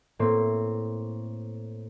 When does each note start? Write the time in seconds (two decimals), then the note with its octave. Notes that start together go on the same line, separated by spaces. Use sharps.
0.19 A2 A#3 C4 B4 C6